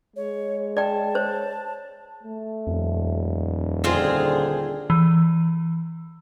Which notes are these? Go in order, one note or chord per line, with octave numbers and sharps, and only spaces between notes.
G#3 C#5
D5 G5 A5
C5 C#5
A3
D#1 F2
D3 C4 F4 G#4
E3